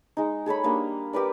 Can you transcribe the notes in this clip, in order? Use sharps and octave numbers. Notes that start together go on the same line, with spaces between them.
G#3 D#4
G#4 A4 C#5 B5
G3 A#3 D4 D#5
G4 A#4 B4 D5